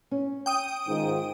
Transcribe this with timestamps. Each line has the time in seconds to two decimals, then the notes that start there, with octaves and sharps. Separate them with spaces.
0.11 C#4
0.46 G5 D#6 D#7
0.88 G#2 D#3 F4